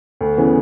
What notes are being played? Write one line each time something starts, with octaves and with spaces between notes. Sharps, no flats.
D2
C#3 E3 B3